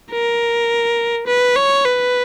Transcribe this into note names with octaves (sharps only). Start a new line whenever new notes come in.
A#4
B4
C#5
B4